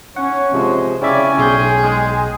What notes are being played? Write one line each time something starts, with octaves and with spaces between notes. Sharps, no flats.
C#4 C#5 F#5
C3 F3 G#3 C5
C#3 C#4 E4 D5 E5 G5 G#5
B1 G#4 C6 G6
G#3